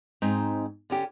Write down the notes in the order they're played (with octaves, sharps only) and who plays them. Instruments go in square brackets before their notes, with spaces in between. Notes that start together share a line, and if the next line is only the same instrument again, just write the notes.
[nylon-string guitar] G#2 C4 D#4
D3 C#4 G4